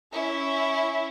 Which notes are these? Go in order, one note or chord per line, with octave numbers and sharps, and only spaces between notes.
C#4 E4